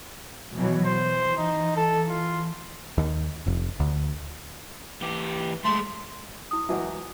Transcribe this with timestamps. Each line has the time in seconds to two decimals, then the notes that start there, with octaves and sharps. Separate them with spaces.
0.56 B2 E3 F#3
0.86 E3 C5
1.37 D#4
1.76 A4
2.09 F4
2.98 D#2
3.46 F1
3.80 D2
5.02 E3 G4
5.64 G#3 A3 C6
6.51 E4 D#6
6.69 C#2 E3 F#3 E5 F#5